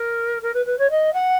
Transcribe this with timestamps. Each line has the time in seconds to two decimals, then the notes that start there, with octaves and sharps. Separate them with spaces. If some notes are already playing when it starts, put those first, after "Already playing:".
Already playing: A#4
0.42 A#4
0.54 B4
0.66 B4
0.78 C#5
0.90 D#5
1.13 F#5